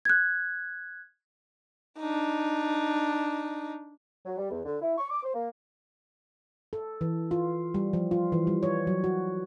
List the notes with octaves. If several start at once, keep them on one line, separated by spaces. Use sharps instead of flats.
F#6 G#6
D4 D#4
F#3
G3
E2
D3
E4
C#6
D6
C5
A#3
A4
E3
F4
G3
F3
F4
E3
G3
C#5
F#3
F#4